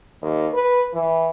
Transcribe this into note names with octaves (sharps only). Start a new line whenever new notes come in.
D#2
B4
E3